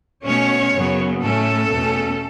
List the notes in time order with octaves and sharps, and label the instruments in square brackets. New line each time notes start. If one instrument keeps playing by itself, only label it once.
[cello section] B2 A3 C#4 C#5
F#2 C#3 F#3 B3
A2 A3 C#4 A4
E2 B2 A3 C#4